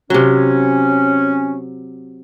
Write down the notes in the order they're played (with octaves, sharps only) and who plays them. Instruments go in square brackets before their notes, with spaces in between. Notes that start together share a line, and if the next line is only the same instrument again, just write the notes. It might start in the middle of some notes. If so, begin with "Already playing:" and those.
[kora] C3 F#3 [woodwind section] C#4